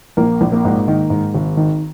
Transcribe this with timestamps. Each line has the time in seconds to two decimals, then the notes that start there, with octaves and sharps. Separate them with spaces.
0.17 A#1 A#3 A#4
0.41 A#1
0.52 A#3 A#4
0.65 G#2
0.88 D#3
1.10 G#2
1.34 G#1
1.57 D#3